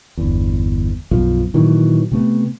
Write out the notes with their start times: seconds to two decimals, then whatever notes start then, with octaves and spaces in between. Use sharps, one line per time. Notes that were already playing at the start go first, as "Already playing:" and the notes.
0.17 G1 E2
1.11 B1 F#2 B2 F3
1.54 A#2 D#3 E3 F#3
2.12 C3 A3 B3